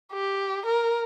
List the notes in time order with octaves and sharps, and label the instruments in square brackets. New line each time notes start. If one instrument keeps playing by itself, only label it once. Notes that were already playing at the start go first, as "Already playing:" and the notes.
[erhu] G4
A#4